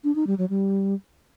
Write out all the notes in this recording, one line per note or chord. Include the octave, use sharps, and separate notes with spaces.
D4
D#4
G3
F#3
G3